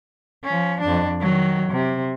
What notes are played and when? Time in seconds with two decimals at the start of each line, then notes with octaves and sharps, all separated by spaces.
0.44 F3 C#4
0.81 F2 D4
1.21 D#3 F#3
1.71 C3